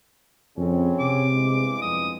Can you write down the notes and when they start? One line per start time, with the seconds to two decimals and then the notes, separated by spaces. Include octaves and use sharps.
0.58 F2 C#3 C4 C#4
1.00 C3 D6
1.32 E2 G2 G#3
1.82 F2 D#6